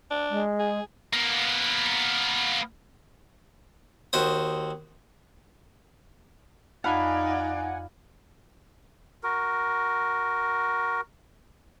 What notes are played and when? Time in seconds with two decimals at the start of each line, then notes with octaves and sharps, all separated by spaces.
0.11 D4
0.30 G#3
0.59 G#4
1.13 A#3 B3
4.13 D#2 F#4 C5 D#6
6.84 F2 D#4 D5 F5 F#5 G#5 B5
9.23 F#4 A#4